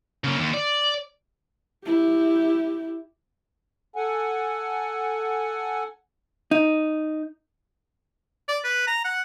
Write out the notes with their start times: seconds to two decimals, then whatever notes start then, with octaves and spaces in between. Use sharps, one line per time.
0.24 C#3 A#3
0.38 D#2
0.54 D5
1.85 E4 G4
3.96 A4 F#5 G#5
6.51 D#4
8.48 D5
8.64 B4
8.87 A#5
9.04 F#5